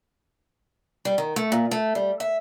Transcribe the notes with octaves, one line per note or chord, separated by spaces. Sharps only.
G3
D#3
A3
A#2
A3
G3
E5